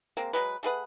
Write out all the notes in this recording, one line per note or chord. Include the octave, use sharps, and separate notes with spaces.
G#3 A#3 C4
F#3 G#3 B4
A3 G#4 B4 F#5